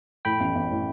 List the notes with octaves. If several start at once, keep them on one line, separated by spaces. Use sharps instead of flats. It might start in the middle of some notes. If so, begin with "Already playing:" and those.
A2 G5 B5
A1
A1
A2